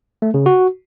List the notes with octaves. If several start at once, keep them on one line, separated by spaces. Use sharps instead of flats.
A3
C#3
F#4